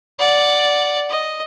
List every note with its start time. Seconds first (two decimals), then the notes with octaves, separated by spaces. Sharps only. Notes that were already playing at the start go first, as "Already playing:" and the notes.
0.19 D5 F#5
1.09 D#5